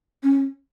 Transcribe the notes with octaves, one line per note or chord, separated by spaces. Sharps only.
C#4